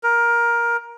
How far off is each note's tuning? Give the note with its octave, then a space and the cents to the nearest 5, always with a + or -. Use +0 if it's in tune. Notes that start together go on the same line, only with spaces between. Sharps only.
A#4 +15